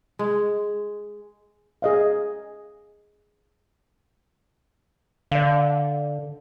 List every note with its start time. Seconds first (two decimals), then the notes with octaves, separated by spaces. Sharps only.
0.19 G#3
1.82 G#4 D#5 F5
5.31 D3 D5 F5